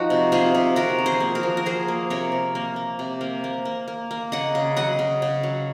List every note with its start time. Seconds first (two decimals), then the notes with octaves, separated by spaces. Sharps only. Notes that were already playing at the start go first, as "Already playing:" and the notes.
Already playing: F3 D#4 F#4
0.10 C3
0.32 C3 F4 G#4
0.55 C3
0.76 C3 F#4 A#4
0.98 F3
1.06 G#4 C5
1.20 A#3
1.35 F#4 A#4
1.43 F3
1.57 A#4
1.65 F3 G#4 C5
1.88 A#3
2.10 C3 A#4 C#5
2.32 C3
2.55 A#3
2.76 A#3
2.99 C3
3.21 A#3
3.44 A#3
3.65 A#3
3.88 A#3
4.11 A#3
4.32 C#3 D#5 F#5
4.55 C#3
4.77 F#3 D#5 F#5
4.99 C#3
5.22 C#3
5.43 F#3